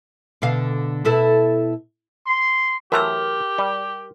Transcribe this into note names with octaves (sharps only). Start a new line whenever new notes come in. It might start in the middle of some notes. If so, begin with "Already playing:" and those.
B2 D3 F5
B2 E4 A4
C6
E3 F#3 A3 G4 A#4 C6 F6
G3